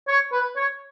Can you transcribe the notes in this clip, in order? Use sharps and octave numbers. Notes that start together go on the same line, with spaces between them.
C#5
B4
C#5